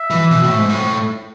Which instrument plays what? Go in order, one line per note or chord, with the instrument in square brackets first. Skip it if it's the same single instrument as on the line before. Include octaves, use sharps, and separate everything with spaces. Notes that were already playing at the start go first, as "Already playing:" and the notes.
Already playing: [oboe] E5
[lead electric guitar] E3
B2
A2
G#2
A2